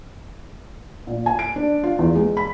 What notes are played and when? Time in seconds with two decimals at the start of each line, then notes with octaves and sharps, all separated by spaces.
1.07 A#2
1.26 G#5
1.39 D7
1.56 D4
1.84 F4
1.99 E2
2.16 G#3
2.37 B5